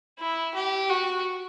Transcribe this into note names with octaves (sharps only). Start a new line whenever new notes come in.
E4
G4
F#4